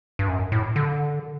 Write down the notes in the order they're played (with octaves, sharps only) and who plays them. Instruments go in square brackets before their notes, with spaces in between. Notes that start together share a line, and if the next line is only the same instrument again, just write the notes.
[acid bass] G2
F#2
A2
D3